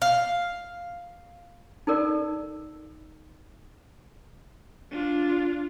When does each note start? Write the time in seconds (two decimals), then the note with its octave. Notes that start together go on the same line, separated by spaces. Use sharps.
0.02 F5
1.87 D#4 A4 A#4 D5
4.91 D4 F4